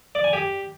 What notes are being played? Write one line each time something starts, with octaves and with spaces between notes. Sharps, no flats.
D5
G#5
G4